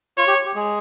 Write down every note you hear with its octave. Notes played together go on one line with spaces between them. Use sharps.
F4 C#5
G4
G4
G#3 G#4